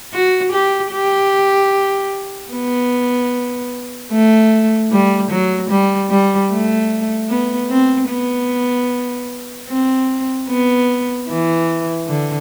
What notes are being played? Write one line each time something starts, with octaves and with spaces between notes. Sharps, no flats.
F#4
G4
G4
B3
A3
G3
F#3
G3
G3
A3
B3
C4
B3
C4
B3
E3
D3